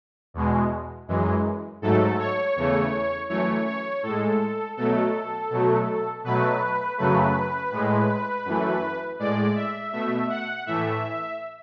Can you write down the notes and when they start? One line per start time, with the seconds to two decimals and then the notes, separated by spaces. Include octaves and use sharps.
0.34 E2 B2 G#3
1.08 F#2 E3 G#3
1.82 G#2 F#3 A3 A4
2.19 C#5
2.56 E2 C#3 E3 A3
3.29 F#2 E3 A3 C#5
3.66 C#5
4.03 A2 G#3 A4
4.77 B2 F#3 A3 A4
5.50 B2 F#3 A3
6.24 B2 F#3 A3 B4
6.98 F#2 C#3 F#3 A3 B4
7.71 A2 G#3
8.45 F#2 E3 A3
9.19 A2 G#3 D5
9.55 E5
9.92 B2 A3 E5
10.29 F#5
10.66 A2 E3 A3 E5